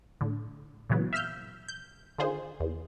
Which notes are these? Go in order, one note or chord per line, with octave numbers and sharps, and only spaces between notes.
A2 D3
A#2 C#3 E3 F#3 B3
E5 F5 E6 F6 G6
G6
D3 D#3 F4 G#4 C5
E2